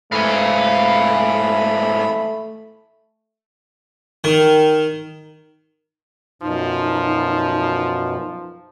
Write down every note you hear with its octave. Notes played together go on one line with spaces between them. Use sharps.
G#2 E3 A3 F5 G#5 B5
D#3
F#2 B2 F3 D#4